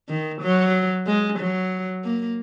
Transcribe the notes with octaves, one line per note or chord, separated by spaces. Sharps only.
D#3
F#3
G#3
F#3
A#3